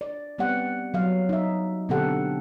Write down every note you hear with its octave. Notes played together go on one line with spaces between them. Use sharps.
D5
G3 B3 C4 G4 D5 F#5
F#3 F5
D#4 E5
B2 D3 C4 G4 A4 F#5